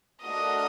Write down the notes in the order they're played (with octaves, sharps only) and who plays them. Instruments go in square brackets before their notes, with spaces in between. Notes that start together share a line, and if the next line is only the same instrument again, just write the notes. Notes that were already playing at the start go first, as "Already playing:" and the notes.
[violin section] A3 D4 F#4 A#4 [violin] D#5